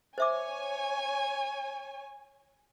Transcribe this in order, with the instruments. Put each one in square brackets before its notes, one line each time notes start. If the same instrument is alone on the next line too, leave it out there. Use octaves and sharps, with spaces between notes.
[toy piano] C5 E5 D6 [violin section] C#5 G#5